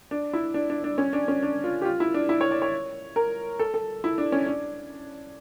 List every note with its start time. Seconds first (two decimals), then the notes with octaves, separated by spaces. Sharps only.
0.11 D4
0.33 E4
0.54 D4
0.70 D4
0.84 D4
0.98 C#4
1.13 D4
1.28 C#4
1.43 D4
1.64 F4
1.82 G4
1.85 F4
2.00 E4
2.14 D4
2.29 E4
2.41 C#5
2.51 D5
2.62 C#5
3.16 A#4
3.59 A4
3.74 A4
4.04 E4
4.18 D4
4.32 C#4
4.46 D4